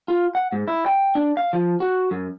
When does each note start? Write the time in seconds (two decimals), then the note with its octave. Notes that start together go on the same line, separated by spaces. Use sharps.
0.08 F4
0.35 F#5
0.52 G#2
0.68 E4
0.86 G5
1.15 D4
1.37 F5
1.53 F3
1.80 F#4
2.11 F#2